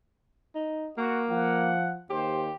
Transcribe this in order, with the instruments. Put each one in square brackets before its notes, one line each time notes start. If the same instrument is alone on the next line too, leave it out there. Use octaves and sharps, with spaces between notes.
[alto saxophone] D#4
[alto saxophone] A#3 [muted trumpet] F#4
[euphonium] F3 [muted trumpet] F#5
[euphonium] D#2 [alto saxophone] G4 [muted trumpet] C5